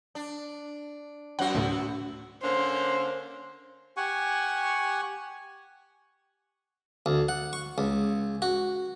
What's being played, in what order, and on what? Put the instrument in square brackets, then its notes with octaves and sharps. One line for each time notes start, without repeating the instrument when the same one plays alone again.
[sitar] D4
[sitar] F#2 C4 F#4 [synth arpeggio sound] F#5
[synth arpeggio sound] D2 A2
[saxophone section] D3 A#3 C#4 [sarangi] C5
[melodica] G4 F#5 G#5 C#6
[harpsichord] D2
F#5
C#6
C#2
F#4